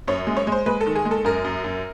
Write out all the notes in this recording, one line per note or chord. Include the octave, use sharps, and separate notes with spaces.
F#2 C#5
G#3
C#5
G#3 C5
G#3 B4
A4
D#3
G#4
G#3
A4
F#2 A#4
F#2
F#2